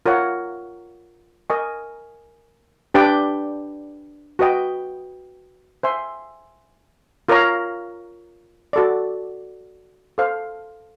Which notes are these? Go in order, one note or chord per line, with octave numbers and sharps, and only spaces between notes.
F4 A#4 C#5 F#5
A#4 D#5 G#5 C#6
D4 G4 B4 D5 G5
F#4 B4 D#5 G5
C5 E5 G#5 C6
F4 A#4 C#5 F5 A#5
F#4 A4 D5
A4 C5 F5